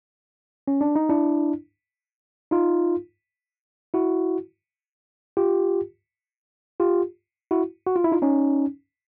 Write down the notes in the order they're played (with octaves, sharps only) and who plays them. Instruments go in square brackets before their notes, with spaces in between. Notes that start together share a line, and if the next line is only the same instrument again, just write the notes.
[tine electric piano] C#4
D4
D#4
D4 E4
D#4 F4
E4 F#4
F4 G4
F4 G4
E4 F#4
F#4
F4
E4
D#4 F4
C#4 D#4